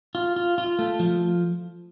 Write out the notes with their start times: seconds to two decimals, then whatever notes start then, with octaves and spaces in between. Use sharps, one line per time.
0.15 F4
0.36 F4
0.58 F4
0.79 A3
0.99 F3